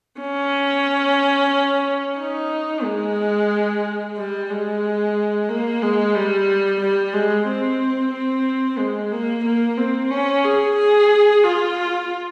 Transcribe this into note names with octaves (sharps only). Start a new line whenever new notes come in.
C#4
D#4
G#3
G3
G#3
A#3
G#3
G3
G3
G#3
C4
C4
G#3
A#3
A#3
C4
C#4
G#4
G#4
F4